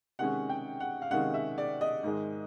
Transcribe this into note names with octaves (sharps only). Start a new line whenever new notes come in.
C3 D#3 G#3 C#4 F#5
G5
F#5
F5
C3 D#3 G#3 C#4 F#5
E5
D5
D#5
G#2 D#3 G#3